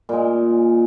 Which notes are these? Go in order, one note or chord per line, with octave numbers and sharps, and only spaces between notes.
A#2 G#3